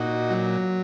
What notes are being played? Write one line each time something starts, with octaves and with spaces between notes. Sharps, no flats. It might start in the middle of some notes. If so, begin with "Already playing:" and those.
Already playing: A#2 D#4 F#4
F#3